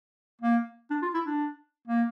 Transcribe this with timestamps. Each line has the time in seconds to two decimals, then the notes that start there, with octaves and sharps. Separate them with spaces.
0.41 A#3
0.90 D4
1.02 F4
1.14 E4
1.26 D4
1.87 A#3